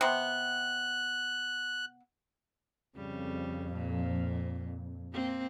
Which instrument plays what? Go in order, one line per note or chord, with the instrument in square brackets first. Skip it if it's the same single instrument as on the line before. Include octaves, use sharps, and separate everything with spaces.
[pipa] C3 B3 [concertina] F#6
[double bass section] F2 [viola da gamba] C#3 G3
[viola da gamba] A#2
A#3 C4